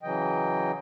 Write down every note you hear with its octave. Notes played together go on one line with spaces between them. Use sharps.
C#3 E3 F#3 D#5 G5